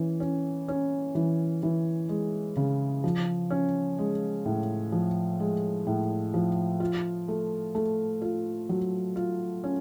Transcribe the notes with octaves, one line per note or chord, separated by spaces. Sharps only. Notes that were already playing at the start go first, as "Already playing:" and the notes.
Already playing: E3 C#4
C#4
C#4
E3
E3
G#3
C#3
F3
C#4
G#3
A2
F3
G#3
A2
F3
F4
A3
A3
F4
F#3
F4
C#4